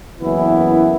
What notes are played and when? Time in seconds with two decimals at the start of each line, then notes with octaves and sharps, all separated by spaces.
0.19 F#1 F#2 E3 B3 E4